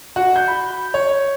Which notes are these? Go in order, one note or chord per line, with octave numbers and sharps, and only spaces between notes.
F#4
G6
B5
C#5